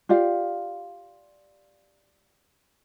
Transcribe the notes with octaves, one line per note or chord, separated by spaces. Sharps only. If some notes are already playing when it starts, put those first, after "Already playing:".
F4 G4 D5 F5